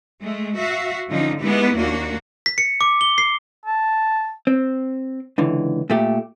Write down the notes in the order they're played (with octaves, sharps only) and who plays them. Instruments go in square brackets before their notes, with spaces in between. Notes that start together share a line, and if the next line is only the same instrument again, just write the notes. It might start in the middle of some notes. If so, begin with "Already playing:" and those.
[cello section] G#3 A3
F#4 E5 F5
D3 F3 C#4 D#4
G#3 B3 D#4 E4 G4
D#2 A#3 D4 F#4
[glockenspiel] B6
C#7
D6
G7
C7
[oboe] A5
[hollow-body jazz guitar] C4
C#2 D3 E3
A#2 A3 G4